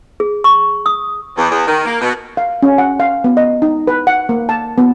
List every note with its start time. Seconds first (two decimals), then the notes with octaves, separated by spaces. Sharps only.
0.20 G#4
0.44 C#6
0.86 D#6
1.37 E2
1.50 E2
1.66 D#3
1.86 A#3
2.01 B2
2.37 F5
2.63 C#4
2.78 F#5
3.00 F5
3.24 B3
3.37 D#5
3.62 D#4
3.87 B4
4.07 F#5
4.29 A#3
4.49 A5
4.78 B3